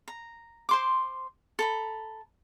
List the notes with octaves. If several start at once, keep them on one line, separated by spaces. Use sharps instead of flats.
A#5
C5 C6 D6
A4 A#5 B5